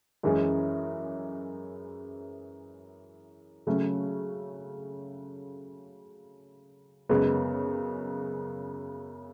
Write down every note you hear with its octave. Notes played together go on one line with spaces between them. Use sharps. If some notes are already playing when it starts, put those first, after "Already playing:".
F#2 E3 G#3 C#4 G#4
C#3 F#3 A3 C#4
F#2 C#3 G#3 B3